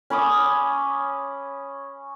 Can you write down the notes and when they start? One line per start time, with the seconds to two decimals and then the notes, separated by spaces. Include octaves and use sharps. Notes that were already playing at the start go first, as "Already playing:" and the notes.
0.10 C#4 B5 D6 D#6